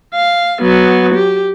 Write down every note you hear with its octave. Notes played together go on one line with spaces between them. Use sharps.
F5
F#3 B3
G4